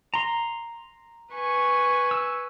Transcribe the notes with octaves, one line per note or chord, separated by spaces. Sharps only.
A#5 C6
B4 G#5 C#6
E6